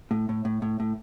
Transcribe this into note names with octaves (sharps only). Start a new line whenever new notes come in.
A2
A2
A2
A2
A2